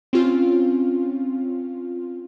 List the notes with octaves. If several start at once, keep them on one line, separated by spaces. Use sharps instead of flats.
C4 C#4 F4